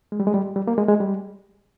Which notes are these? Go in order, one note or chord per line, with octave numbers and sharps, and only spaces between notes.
G#3
G3
G#3
G3
G3
A#3
G#3
G#3
G3